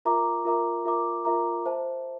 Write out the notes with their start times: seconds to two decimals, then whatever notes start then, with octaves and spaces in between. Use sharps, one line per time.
0.05 F4 A#4 E5 A#5 D6
0.45 F4 A#4 E5 A#5 D6
0.85 F4 A#4 E5 A#5 D6
1.24 F4 A#4 E5 A#5 D6
1.66 C5 E5 A5